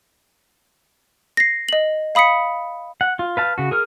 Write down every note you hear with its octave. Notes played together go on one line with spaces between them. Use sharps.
A#6 C7
D#5 F#7
F5 B5 D#6 B6 C#7
F#5
F4
B4 F5 A5
C#3 F#4
G#4 A#4 F6